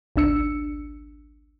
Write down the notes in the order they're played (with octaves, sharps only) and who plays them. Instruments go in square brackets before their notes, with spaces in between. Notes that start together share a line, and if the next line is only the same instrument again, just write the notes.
[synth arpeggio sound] G#1 C#2 D4 E6 C#7